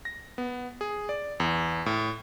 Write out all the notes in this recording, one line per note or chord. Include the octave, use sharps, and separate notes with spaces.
A#6
B3
G#4
D5
E2
A2